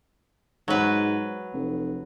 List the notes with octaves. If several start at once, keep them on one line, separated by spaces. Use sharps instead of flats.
G#2 F#3 B4
F1